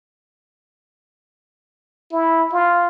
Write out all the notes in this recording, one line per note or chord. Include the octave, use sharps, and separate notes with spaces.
E4
F4